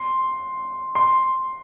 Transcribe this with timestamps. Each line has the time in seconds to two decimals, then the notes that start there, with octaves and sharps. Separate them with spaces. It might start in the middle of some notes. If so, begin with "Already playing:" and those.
Already playing: C6
0.95 C6